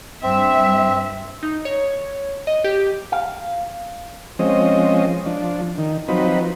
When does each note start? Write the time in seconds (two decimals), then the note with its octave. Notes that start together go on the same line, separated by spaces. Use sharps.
0.23 G2 C4 E5
1.43 D#4
1.65 C#5
2.47 D#5
2.64 G4
3.12 F5
4.39 F3 G#3 C4 C#4 D#5
5.26 F3 D4
5.78 D#3
6.08 F3 F#3 C4 D#4 B4